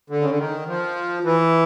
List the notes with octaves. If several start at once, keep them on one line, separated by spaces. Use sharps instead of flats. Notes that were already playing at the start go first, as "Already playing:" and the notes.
D3
C#3
D3
D#3
F3
E3